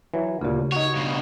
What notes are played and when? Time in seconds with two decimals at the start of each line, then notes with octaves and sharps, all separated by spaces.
0.14 E3 F#3
0.41 D2 A#2 C#3 G4
0.72 D#4 F#4 C#5
0.95 G2 B2